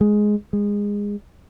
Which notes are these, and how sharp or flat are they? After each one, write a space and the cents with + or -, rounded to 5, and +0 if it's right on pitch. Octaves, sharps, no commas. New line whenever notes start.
G#3 +5
G#3 -20